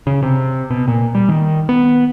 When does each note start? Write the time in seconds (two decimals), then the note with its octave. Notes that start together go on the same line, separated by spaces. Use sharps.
0.07 C#3
0.23 C3
0.70 B2
0.88 A#2
1.15 G3
1.29 D#3
1.69 B3